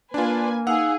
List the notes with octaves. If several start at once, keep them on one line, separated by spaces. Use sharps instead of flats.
A#3 D4 F4 B4 G#5
D#4 G#4 F5 F#5 E6